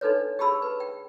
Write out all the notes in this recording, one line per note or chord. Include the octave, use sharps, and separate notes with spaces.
D4 D#4 A4 B4 C#5
G4 G#4 A5 B5 E6
B4
G5